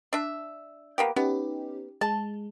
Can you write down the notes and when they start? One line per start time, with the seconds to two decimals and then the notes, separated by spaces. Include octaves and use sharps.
0.13 D4 E5
0.98 A#3 B3 G4
1.16 B3 C#4 D#4 G4
2.01 G#3 A5